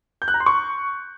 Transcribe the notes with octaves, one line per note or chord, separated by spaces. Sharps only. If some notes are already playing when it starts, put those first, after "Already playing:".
G6
F#6
A#5
C6
C#6